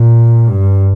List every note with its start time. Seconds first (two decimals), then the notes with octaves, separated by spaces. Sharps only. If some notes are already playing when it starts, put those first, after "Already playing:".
Already playing: A#2
0.49 G2